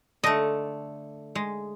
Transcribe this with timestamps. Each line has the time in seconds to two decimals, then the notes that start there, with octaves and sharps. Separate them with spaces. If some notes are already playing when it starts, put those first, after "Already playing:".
0.24 D3 A3 D#5
1.35 G#3